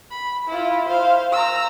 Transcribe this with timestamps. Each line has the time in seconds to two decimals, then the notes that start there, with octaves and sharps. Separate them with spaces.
0.11 B5
0.47 E4 F4
0.87 C5 F5
1.32 A#5 E6